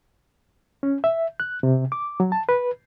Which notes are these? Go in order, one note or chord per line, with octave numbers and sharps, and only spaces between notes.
C#4
E5
F#6
C3
D6
F#3
A5
B4